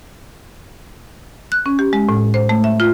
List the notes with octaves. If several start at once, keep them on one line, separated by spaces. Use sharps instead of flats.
F#6
C#4
G4
G#3
A2
C5
A3
E5
F4